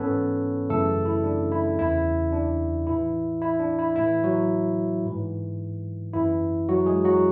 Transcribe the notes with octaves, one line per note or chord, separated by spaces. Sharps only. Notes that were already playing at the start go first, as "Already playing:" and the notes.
Already playing: G#2 E3 B3 C#4 A4 B4 C#5
F#2 C#3 E3 A3 A4
E4
D4
E4
E2 C#3 E3 E4
D4
A2 E3 E4
E4
D4
E4
A2 E3 E4
F#3 F#4
G#2 E3
F#2 E3 E4
F#3 F#4
G#3 G#4
F#3 F#4